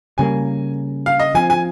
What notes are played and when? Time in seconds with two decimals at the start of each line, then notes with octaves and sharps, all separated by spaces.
0.18 C#3 G3 A#3 G#5
1.06 F5
1.20 D#5
1.35 F3 C4 G#5
1.50 G#5